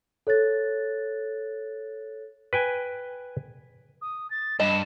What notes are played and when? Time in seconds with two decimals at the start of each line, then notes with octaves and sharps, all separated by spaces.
0.27 A4 C#5 F#6 A6
2.53 B4 G5 G#5
4.02 D#6
4.31 A6
4.60 G2 D#5 E7